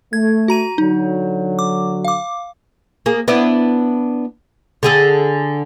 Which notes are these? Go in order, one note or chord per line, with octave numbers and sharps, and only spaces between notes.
A3 G#6
F#4 A#5 D#7
D3 F#3 D#4
D6
F5 D6
A#3 G#4
B3 D4 E4
D3 G#4 A4